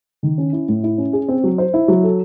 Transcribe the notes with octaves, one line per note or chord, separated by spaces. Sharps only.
D#3
C#4
E4
A2
E4
C#4
G#4
C4
F#3
C5
E4
F#3
A4